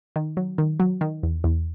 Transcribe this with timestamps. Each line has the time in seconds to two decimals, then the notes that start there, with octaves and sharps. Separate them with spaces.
0.16 D#3
0.37 F#3
0.58 D#3
0.80 F#3
1.01 D#3
1.23 E2
1.44 E2